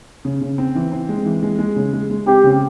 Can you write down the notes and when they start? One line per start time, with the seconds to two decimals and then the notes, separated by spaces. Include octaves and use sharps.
0.25 C#3
0.41 C#3
0.58 C4
0.75 E3
0.92 C4
1.09 G#3
1.26 E3
1.43 G#3
1.59 G#3
1.76 C#3
1.93 G#3
2.10 G#3
2.27 C4 G4
2.44 C#3